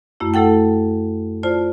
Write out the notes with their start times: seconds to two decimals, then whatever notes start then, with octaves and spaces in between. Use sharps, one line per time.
0.20 F#2 A3 E4
0.34 A3 E4 A4 F#5 G5
1.43 F4 C5 D5 A5